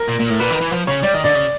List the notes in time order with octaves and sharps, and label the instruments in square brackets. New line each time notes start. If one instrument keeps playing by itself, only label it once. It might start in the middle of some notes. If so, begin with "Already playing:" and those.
Already playing: [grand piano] A#4
[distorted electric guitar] A#2
A#2
A2
[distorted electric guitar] A#2 [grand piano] B4
[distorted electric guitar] D#3
[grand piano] B4
[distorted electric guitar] E3
F3
[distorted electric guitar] C#3 [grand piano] C#5
[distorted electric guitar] G3 [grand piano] D5
[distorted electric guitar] D#3 [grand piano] D#5
[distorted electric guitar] D3 [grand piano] D5
[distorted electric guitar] C#3